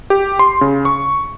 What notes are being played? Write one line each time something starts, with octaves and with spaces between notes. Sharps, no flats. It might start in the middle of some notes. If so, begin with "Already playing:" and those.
G4
C6
C#3
C#6